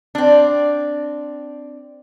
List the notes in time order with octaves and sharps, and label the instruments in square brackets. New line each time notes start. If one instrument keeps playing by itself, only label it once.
[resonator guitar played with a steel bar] C4 D4